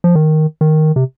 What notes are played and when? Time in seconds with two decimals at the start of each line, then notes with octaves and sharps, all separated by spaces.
0.04 F3
0.15 D#3
0.61 D#3
0.96 C3